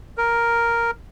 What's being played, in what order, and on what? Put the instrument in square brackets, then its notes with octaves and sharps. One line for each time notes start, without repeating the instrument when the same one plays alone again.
[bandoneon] A#4